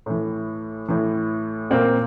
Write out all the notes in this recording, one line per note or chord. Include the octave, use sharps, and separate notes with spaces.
A2 E3
A2 E3
A#2 A#3 C4